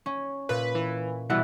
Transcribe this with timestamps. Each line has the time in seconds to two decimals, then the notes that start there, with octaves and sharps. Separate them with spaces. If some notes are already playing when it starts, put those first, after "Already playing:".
0.06 C#4
0.49 A#2 B4
0.75 E3
1.30 B2 E3 G3 E4 F#5